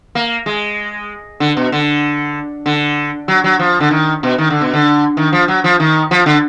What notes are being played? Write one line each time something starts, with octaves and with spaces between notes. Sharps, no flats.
A#3
G#3
D3
B2
D3
D3
F#3
F#3
F3
D3
D#3
B2
D#3
D3
B2
D3
D#3
F3
F#3
F3
D#3
F3
D3